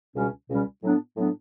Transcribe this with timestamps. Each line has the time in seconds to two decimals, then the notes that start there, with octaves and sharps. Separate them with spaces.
0.16 C#2 B2 G3 C#4
0.50 C#2 B2 G3 C#4
0.83 A2 F#3 B3 D4
1.17 A2 F#3 B3 D4